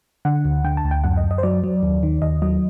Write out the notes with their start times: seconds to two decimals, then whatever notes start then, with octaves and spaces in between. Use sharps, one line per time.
0.25 D3 F#5
0.45 D2
0.64 D3 G5
0.77 A5
0.85 D2
0.91 G5
1.04 F#2 F#5
1.17 D#5
1.24 F#2
1.31 D#5
1.38 C5
1.43 F#3 D5
1.64 F#3
1.83 D#2
2.03 D#3
2.22 D#2 D#5
2.42 F#3 D#5